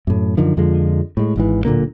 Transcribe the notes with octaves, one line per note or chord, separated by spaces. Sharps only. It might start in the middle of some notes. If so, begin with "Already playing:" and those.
F#2 A2
F#2 D3 D#3 F3
F2 D3 F3 G#3
A2 G#3
G#1 G#2 E3
D1 A#2 D3 A#3